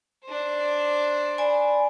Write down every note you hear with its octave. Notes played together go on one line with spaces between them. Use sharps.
D4 C5
D5 G#5 B5